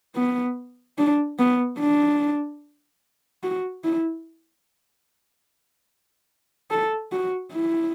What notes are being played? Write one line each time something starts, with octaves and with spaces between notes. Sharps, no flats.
B3
D4
B3
D4
F#4
E4
A4
F#4
E4